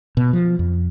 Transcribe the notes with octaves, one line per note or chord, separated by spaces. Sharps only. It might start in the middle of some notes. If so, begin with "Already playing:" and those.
B2
F3
F2